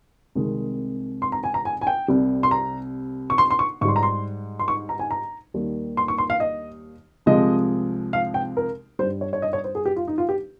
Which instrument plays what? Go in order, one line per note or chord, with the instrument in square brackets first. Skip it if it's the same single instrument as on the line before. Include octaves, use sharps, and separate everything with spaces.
[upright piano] C2 C3 D#3 G#3
C6
A#5
G#5
A#5
G#5
G#5
G5
C2 C3 G3
C6
A#5
C#6
C6
C6
C#6
G#2 C#6
G3 C6
A#5
C6
C6
C#6
A#5
G#5
A#5
D#2 D#3 G3
C6
C#6
C6
F5
D#5
C2 C3 F3 G#3 D#5
F5
G5
A#4
G3 C5
G2
C#5
C#5
D#5
C#5
C5
G#4
G4
F4
D#4
F4
G4